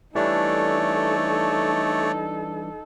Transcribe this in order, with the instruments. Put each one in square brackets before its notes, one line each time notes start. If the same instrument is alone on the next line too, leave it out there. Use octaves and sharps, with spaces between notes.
[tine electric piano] E3 G3 D4 [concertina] A3 C#5 D5 [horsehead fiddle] D#4 A4